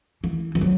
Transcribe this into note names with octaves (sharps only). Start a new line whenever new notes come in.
E3
E3
F#3